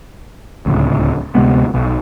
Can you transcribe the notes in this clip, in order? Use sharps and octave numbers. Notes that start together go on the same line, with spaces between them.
D1 G#1 C#2
D2 C3 G#3 B3
B1